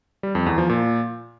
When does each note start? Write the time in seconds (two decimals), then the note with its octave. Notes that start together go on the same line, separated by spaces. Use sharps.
0.23 G3
0.35 F2
0.46 E2
0.58 F3
0.69 A#2